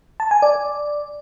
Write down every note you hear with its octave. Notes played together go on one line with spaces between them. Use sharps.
A5
G#5
D5